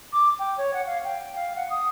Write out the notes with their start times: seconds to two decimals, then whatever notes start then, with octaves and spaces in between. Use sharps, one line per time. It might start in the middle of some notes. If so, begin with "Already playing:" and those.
0.13 D6
0.39 G5
0.58 C#5
0.74 F#5
0.87 F5
1.04 G5
1.35 F5
1.57 F#5
1.70 D#6